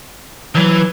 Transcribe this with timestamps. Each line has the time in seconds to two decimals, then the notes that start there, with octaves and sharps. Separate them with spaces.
0.55 E3 F#3